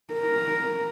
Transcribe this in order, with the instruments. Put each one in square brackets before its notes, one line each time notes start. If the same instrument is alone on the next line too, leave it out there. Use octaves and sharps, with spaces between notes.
[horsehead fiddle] A#4